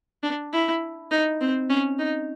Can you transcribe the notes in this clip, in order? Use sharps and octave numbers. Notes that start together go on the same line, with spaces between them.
D4
E4
D#4
C4
C#4
D#4